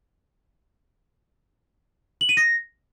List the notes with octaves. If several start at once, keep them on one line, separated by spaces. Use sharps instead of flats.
F#7
D#7
A#6